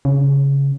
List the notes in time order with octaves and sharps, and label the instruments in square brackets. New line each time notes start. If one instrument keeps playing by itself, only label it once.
[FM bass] C#3